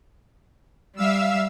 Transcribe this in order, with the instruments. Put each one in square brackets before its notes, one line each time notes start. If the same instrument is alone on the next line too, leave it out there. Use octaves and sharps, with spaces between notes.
[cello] G3 [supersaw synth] E5 F5 E6